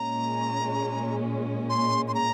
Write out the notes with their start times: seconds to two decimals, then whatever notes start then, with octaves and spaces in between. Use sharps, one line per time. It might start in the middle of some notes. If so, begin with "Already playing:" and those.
Already playing: A#2 G#3 C#4 A#5
1.70 C6
2.08 C6
2.14 A#5